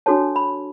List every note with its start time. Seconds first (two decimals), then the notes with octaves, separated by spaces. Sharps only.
0.06 D4 F#4 A4 C#5 A5
0.36 B5